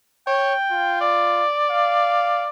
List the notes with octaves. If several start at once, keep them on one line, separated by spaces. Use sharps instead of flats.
C#5 G5
F4
D5
F5